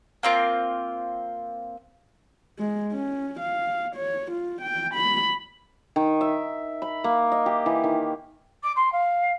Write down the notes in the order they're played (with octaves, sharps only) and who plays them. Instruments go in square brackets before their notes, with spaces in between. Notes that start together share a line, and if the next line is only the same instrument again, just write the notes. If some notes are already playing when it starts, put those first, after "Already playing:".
[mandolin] A#3 C4 F4
[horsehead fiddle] G#3
C#4
F5
C#5
F4
G5
B5
[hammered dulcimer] D#3
E5
B5
A#3
D#5
G4
E3
D#3
[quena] D6
C6
F5